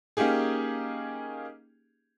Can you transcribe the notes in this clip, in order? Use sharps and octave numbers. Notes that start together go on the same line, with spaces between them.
A#3 C#4 D#4 G4 G#4